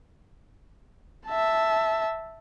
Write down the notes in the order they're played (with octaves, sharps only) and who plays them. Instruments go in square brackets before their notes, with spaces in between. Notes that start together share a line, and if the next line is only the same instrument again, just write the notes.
[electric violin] E5 A5